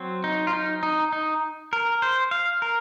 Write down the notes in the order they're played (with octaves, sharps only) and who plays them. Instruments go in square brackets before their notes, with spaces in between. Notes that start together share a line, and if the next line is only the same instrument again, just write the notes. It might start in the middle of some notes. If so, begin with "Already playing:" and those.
Already playing: [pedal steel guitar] F#3 C4
D#4
F4
D#4
D#4
D#4
A#4
C5
F5
A#4